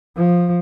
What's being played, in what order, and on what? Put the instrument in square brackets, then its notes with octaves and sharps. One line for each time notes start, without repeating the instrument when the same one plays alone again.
[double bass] F3